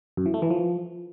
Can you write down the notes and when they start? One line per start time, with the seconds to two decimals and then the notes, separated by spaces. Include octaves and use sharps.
0.17 F#2
0.26 E3
0.34 A3
0.42 E3
0.50 F3